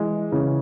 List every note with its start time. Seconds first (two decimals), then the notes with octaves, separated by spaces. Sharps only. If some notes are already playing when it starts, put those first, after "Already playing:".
Already playing: E3 G#3
0.32 C#3 E3